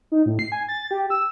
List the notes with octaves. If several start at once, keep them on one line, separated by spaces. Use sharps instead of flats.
D#4
A2
C7
G#5
A6
G4
E6